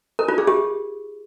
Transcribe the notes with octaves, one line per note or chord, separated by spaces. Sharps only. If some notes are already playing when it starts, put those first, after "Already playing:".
A#4
F4
G#4
G4